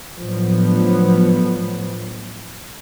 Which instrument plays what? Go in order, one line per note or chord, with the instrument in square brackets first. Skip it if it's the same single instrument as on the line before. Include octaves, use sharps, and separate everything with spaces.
[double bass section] A2 D3 F3 F#3 B3